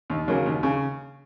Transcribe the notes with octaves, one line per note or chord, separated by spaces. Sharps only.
D#2
C#3 F#3 A#3
D#2
C#3